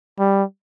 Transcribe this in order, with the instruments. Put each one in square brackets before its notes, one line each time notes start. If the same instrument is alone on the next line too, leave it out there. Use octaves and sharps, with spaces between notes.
[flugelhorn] G3